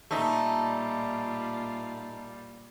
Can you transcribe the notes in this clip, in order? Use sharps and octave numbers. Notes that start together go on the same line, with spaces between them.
A#2 G3 A3 D#4 F4